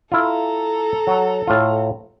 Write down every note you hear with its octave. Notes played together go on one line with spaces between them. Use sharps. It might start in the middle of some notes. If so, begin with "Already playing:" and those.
E4 F4 A4 A#5
F#3
A2 F4